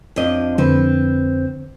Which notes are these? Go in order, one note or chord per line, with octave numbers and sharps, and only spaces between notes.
F2 D4 D#5
F2 D3 C4 B4 C5